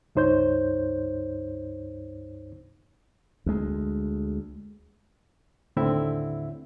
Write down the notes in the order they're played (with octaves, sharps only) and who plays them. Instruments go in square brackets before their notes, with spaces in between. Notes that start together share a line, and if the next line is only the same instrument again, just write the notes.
[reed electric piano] C#2 G2 D#4 C5 C#5 G6
[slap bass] D2 G#3
[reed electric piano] D#2 A2 D3 C4 E4 E5